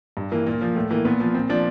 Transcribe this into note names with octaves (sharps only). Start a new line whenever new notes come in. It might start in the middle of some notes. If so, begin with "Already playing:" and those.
G2
E3 A#3
A#2 A#3
F3
A2 A3
E3 A#3
A#2 B3
F3
A#2 C4
F3 D4